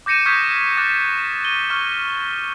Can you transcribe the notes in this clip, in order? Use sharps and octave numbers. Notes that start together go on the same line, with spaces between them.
D6 G6 A#6 C#7 D#7 E7
C#6 D#6 F6 G6 G#6 B6
D6 F#6 A6
D#7 G7
C#6 F6